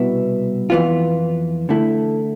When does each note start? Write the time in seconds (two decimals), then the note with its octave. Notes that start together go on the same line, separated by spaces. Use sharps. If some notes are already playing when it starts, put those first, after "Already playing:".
Already playing: C2 B2 B3 E4
0.70 F2 E3 B3 F4
1.69 D3 A3 E4